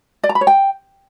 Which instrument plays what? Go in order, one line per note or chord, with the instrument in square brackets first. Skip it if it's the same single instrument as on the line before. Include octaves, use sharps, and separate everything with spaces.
[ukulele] D5
A#5
B5
C#5
G5